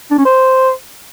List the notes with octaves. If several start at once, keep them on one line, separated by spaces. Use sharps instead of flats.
D4
C#4
C5